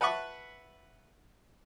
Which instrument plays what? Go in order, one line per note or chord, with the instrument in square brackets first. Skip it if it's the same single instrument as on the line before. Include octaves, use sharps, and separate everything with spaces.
[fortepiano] B4 E5 F#5 A5 B5 C#6